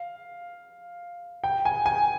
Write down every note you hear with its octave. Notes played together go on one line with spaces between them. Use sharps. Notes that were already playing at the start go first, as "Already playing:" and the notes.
Already playing: F5
G5
G#5
G#5